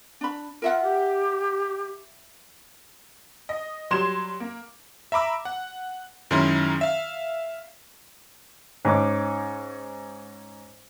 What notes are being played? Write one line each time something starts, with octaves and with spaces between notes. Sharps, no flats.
D4 B5
F4 A#4 E5 F#5
G4
D#5
F#3 G3 C6 G#6 E7
A#3
E5 A#5 B5 D6 E6
F#5
F#2 D#3 G#3 C#4 E4 C6
E5 F5
G#2 C#4 D#4 D6